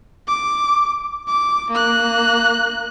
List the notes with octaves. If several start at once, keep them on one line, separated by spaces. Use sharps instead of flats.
D6
D6
A#3 F#6